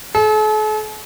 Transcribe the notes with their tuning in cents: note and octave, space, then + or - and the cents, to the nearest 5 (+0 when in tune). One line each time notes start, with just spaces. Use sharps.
A4 -45